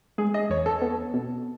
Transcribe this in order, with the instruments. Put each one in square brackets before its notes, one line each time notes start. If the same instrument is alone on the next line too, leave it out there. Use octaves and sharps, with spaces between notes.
[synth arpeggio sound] G#3 [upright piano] G#4
[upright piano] D#5
[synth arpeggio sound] E2 [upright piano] C#5
[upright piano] A4
[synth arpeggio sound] B3
B2